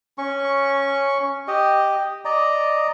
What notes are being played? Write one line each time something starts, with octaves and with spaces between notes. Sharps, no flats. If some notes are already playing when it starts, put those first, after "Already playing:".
C#4 C#6
G4 D#5
D5 D#5 A#5